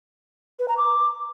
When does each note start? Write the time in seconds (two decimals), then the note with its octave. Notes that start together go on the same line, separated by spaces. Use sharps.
0.59 B4
0.68 A#5
0.77 D6